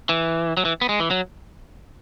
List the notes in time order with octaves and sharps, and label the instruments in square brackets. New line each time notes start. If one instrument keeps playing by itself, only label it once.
[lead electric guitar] E3
F#3
E3
B3
G#3
E3
F#3